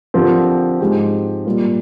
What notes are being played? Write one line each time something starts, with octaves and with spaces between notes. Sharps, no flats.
D3 F3 C4 G4 A#4
G#2 F3 G#3 C4 G4
A#2 G3 A#3 F4